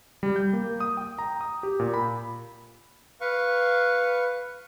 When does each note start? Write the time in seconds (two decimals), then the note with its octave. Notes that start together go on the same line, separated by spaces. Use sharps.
0.23 G3
0.36 G6
0.53 A#3
0.80 D#6
0.97 G5
1.19 A#5
1.41 D#6
1.63 G4
1.80 A#2
1.94 B5
3.21 B4 F5 C#6